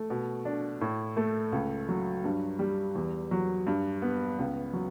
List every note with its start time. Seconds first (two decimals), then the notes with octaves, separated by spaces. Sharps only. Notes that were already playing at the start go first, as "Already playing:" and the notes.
Already playing: A3
0.10 B2
0.45 D4
0.81 A2
1.17 A3
1.52 C#2
1.89 F#3
2.24 G2
2.59 G3
2.95 E2
3.31 F#3
3.67 G2
4.02 B3
4.39 C#2
4.73 F#3